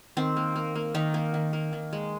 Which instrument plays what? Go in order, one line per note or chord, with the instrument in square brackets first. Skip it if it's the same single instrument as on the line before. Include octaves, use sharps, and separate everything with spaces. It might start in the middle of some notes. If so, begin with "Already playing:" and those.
[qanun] D#3 C4
A#3
A#3
A#3
D#3 D#4
A#3
D#3
A#3
D#3
G#3